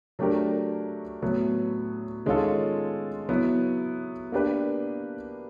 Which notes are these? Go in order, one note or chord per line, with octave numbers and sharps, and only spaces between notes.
F#3 A3 D4 G4 A#4
A2 F#3 B3
D#3 G#3 C#4 F4 A4
F#3 B3 E4
A#3 D4 G4 B4